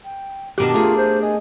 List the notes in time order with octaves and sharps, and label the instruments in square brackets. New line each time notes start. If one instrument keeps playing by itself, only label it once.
[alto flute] G5
[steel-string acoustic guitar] D#2 B2 A5 [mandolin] D4 A#4 F#6 [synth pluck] G4 D6
[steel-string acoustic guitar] A3 G#4 [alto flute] F4
[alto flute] C5
[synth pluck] D#5 [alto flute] G#5